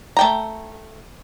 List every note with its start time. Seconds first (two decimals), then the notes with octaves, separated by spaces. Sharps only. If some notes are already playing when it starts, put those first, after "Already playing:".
0.17 A3 G5 A#5